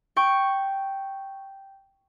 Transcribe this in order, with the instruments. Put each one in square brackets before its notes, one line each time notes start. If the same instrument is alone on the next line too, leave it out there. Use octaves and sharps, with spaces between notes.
[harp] G5 C#6